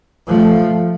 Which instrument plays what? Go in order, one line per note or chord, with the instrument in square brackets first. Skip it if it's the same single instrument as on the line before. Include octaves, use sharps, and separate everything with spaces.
[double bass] F3 [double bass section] A3